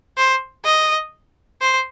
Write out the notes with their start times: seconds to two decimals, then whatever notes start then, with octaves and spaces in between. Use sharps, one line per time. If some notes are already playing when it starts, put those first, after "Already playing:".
0.18 C5
0.65 D#5
1.61 C5